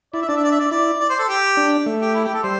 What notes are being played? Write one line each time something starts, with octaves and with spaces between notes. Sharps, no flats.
E4 D5
E5
D4 D5
E5
D5
E5
D5
E4 D5
D5
C5
A4
G4
D4
A3
G4
E4
G4
A4
G3 C5